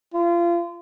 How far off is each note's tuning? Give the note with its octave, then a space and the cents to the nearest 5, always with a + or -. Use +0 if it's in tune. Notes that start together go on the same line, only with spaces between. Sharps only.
F4 -30